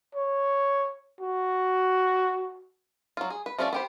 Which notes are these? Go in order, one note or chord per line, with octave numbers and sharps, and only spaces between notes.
C#5
F#4
F#3 F4
G#4
B4
F3 A3 C#4 G#4 D5
B3 G4 C5